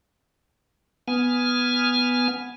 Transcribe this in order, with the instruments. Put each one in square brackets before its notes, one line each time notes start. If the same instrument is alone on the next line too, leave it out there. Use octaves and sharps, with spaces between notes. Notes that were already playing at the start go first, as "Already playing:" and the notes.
[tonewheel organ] B3 G#5 F6